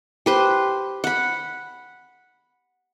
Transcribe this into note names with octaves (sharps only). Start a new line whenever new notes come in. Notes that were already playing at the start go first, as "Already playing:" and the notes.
G4 B4 C5
F#5 B5